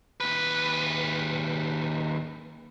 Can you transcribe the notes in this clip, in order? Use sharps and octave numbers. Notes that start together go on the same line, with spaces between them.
D#2 B4